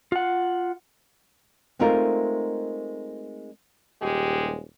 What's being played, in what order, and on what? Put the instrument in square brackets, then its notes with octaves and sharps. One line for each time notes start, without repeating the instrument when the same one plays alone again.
[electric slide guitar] F4 F#5
[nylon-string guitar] G#3 A3 C4 D#4 F4 A#4
[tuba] D#1 [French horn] G#3 [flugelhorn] G4